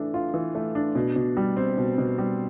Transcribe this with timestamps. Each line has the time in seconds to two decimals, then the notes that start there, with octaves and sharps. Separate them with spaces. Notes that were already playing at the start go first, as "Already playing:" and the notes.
Already playing: E3 A3 D4
0.14 F4
0.34 E3
0.55 A3
0.75 D4
0.95 B2
1.16 B2
1.37 G3
1.57 C4
1.78 B2
1.98 B2
2.18 G3